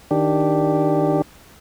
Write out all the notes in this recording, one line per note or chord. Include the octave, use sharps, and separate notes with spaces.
D#3 D4 G4